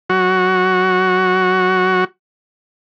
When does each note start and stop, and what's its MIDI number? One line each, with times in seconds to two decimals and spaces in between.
0.10 2.04 54
0.10 2.04 66